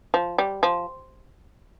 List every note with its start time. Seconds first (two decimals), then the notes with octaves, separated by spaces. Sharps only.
0.14 F3
0.38 G3
0.63 F3